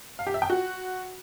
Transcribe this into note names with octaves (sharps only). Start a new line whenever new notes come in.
F5
G4
E5
G5
F#4